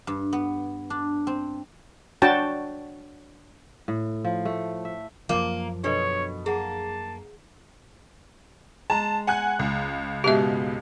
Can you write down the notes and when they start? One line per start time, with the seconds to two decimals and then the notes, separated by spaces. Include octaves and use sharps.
0.07 G2
0.33 B3
0.90 D4
1.27 C4
2.22 D4 F#4 C#5 G5 A5
3.88 A2
4.24 F3
4.45 A3
4.85 E5
5.29 F#2 F3 A#3 A#4
5.84 B2 D4 A4 C#5 D#5
6.46 A#3 G#4 F#5 A5
8.90 G#3 A5 A#5
9.27 F#5 G#5 F#6
9.59 C#2
10.24 G#2 B2 G4 E5 F7